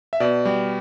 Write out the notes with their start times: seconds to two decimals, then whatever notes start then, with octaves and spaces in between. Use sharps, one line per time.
0.13 E5
0.20 B2 D5
0.45 G3